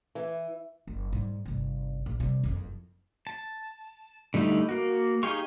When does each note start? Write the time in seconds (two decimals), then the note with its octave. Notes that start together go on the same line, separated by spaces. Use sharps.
0.15 E3
0.87 F#1
1.13 G#2 G3
1.45 G1 C3
2.06 A#1
2.20 C3 G3
2.43 F#1 F2
3.27 A5
4.34 D3 G3 A3 D#4 E4
4.69 A#3 F#4
5.23 D#4 G4 G#4 F5 C#6